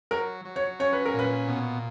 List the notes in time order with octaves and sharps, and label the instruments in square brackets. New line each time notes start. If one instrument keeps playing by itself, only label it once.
[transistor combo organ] F#3 [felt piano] A#4
[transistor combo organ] F#3
[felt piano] C#5
[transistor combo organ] C#4 [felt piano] C#5
[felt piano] B4
A#4
[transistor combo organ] A#2 [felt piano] B4
[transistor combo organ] B2